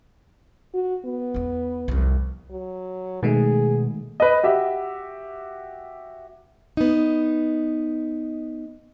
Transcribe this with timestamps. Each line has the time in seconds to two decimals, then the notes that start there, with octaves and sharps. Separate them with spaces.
0.74 F#4
1.05 B3
1.34 E2 D#4
1.88 C2 F2
2.50 F#3
3.23 B2 D#3 G#3 A3 G#4
4.20 B4 D#5
4.43 F#4 G4 E5
6.77 B3 D#4